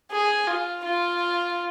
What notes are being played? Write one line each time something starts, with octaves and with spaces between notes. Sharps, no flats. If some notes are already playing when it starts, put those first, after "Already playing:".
G#4
F4
F4